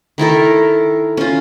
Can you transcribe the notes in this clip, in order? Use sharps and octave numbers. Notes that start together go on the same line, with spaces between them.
D#3 E4 A4 A#4
C#4 F4